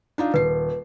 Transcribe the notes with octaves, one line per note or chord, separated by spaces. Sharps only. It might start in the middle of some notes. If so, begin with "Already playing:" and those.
D4 D#4 F4
D#1 B4 C7